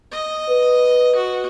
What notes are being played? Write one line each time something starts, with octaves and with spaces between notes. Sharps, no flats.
D#5
B4
F#4